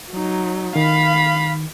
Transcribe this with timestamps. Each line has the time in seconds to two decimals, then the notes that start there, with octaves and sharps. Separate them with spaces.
0.11 F#3 D#4
0.76 D#3 F5 B5